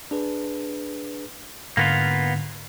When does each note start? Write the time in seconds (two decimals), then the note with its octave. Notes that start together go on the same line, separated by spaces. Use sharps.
0.11 D4 G#4 B4
1.77 G#2 D3 A#3 B3 F4